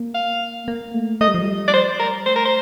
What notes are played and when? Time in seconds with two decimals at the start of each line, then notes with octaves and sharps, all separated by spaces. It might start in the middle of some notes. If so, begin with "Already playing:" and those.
Already playing: A#3
0.14 F5
0.68 A#3
0.94 A3
1.21 A3 D#5
1.28 G3
1.34 F3
1.42 G3
1.68 D5
1.73 C5
1.99 A#4
2.26 A3 C5
2.36 A#4
2.45 C5